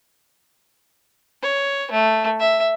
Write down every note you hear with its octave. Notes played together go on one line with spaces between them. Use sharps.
C#5
A3
E5